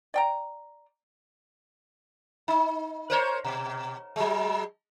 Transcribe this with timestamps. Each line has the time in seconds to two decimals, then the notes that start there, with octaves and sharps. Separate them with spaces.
0.14 D5 G5 A#5
2.48 D#4
3.10 A#4 C5 C#5
3.44 B2
4.16 F#3 G#3